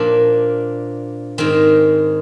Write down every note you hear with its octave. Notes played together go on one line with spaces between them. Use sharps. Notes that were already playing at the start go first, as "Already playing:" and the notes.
Already playing: A#2 F3 D4
G#2 D#3 C4